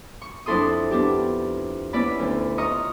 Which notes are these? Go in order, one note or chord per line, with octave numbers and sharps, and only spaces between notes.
C#6
F2 D4 E4 A4 C6 D#6
B3 D4 G4
B3 C#4 E4 D5 B5
D2
F4 D#5 A#5 C#6 D#6